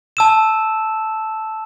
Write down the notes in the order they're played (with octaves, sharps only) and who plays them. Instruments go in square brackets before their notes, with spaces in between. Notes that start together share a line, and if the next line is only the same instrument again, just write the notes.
[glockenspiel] A5 E6 E7